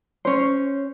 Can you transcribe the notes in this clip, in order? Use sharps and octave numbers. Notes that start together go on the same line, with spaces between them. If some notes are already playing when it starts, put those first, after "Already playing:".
C#4 C5